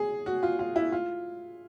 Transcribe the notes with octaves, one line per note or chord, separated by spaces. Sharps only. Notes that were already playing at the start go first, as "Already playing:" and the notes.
Already playing: G#4
F#4
F4
F4
E4
F4